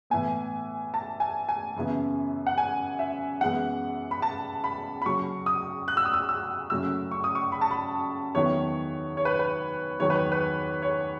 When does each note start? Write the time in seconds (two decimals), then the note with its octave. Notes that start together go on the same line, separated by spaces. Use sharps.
0.10 A2 E3 B3 G#5
0.94 A5
1.20 G#5
1.49 G#5
1.76 F#2 C#3 E3 B3 E4
2.47 F#5
2.58 G#5
2.99 E5
3.41 F#2 E3 G#3 B3 F#5
4.11 B5
4.22 A5
4.64 B5
5.02 B5
5.05 C#3 F#3 C#4 C#6
5.46 D#6
5.88 F#6
5.97 E6
6.06 D#6
6.14 E6
6.29 E6
6.70 F#2 C#3 F#3 A3 C#4 E6
7.11 C#6
7.24 D#6
7.35 C#6
7.52 B5
7.61 A5
7.71 B5
8.35 E2 D#3 F#3 B3 E4 C#5
9.17 C#5
9.25 B4
9.39 B4
10.00 E2 D#3 F#3 C#5
10.10 B4
10.32 B4
10.82 C#5